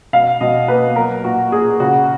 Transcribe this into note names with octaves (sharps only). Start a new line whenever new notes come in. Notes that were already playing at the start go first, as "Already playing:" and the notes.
B2 F5
B2 D#5
A#3 B4
F#3 A#4
A#2 F#4
A#2 G#4
C#3 F#4